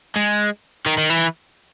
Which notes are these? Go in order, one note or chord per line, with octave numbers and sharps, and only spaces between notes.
G#3
D#3
D#3
E3